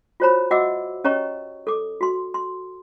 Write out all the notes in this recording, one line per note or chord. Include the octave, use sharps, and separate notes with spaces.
F4 F#4 C5 C#5 A#5 B5
F#4 D#5 E5 F#5 D6 E6
C#4 G4 C#5 D#5 A#5 C#6
A4 D6
F#4 C6
C6